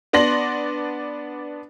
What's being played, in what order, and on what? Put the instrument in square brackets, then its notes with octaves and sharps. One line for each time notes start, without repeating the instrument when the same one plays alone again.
[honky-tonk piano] B3 D4 D5 C6 A#6 F#7